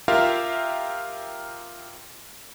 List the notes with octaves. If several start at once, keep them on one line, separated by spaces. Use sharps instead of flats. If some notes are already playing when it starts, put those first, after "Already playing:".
F4 G4 A#4 E5 F5